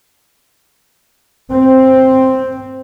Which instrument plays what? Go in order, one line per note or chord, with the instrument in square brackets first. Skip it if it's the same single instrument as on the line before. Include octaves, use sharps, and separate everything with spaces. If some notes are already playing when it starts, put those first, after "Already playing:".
[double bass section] C4